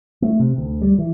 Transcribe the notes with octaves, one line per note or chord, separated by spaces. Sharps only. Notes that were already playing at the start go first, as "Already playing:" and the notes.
A3
C3
D2
G3
E3